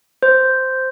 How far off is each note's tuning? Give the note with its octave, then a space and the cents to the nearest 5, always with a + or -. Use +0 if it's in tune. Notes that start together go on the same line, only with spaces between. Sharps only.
C5 -5